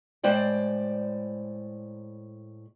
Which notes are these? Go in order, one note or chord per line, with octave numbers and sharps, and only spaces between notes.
A2 G#3 C5 D5 G5